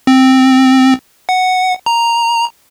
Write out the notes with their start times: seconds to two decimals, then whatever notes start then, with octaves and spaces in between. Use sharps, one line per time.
0.07 C4
1.29 F#5
1.86 A#5